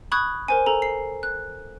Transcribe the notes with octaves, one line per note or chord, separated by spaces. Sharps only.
B5 C#6 D#6 F#6 G#6
A#4 C5 G#5
A4 A#5
C7
F#6